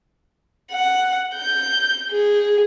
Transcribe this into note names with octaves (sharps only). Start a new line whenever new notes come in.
F#5
G6
G#4